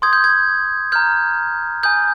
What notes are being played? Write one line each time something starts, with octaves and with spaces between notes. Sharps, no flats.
C6 D#6 G6 G#6
G6
G#6
A#5 F6 G6
G#5 D#6 G6